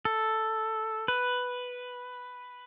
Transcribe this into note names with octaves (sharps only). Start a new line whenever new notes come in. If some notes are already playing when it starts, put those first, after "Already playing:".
A4
B4